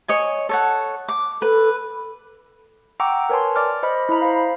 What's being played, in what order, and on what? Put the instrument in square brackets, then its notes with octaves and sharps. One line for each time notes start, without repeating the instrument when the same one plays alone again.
[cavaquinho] C#5 D#5 G#5
A4 C#5 F#5
D6
[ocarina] A4 [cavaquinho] B4
[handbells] F#5 G5 A#5 C#6 D6 E6
A#4 B4 C#5 G#5 A5 C6
D5 D6 F6
C5 D#5 B5 F6
E4 D#5 A#5 B5
C5 F5